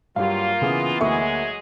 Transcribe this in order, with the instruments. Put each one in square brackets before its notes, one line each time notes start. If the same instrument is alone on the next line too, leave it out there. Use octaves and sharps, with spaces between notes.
[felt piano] G2 G4 [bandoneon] F#3 [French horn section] A#3 F4 [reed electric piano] F5
[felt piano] C#3 G#4 [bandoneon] E3 B3
[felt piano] D2 A#3 C#6 [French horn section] F#3 G#3 G#4 [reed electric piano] E5